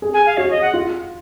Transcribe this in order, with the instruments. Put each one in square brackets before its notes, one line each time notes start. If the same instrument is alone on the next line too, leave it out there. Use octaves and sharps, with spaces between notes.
[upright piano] G#4
[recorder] G#5
F5
[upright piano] F#4 [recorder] C#5
[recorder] D#5
F#5
[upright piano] F4